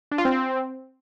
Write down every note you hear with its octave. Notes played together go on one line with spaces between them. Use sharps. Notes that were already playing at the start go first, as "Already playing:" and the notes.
D4
F4
C4